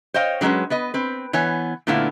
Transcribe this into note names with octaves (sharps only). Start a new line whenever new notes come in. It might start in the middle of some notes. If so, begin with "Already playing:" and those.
C5 C#5 D#5 F5 G5
D3 F#3 G#3 C#4 B4
B3 B4 D#5
C4 B4
E3 B3 C#5 G#5
A#2 D3 A3 B3 E4 F5